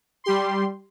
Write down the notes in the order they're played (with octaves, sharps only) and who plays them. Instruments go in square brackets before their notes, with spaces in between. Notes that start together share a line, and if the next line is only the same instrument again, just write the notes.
[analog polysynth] G3 G4 C6